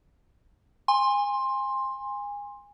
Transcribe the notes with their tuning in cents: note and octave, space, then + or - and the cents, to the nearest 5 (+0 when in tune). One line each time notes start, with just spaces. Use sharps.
G#5 -25 C6 +15